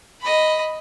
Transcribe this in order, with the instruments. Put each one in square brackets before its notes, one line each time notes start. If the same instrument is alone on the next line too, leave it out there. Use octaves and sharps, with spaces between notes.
[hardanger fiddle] D#5 B5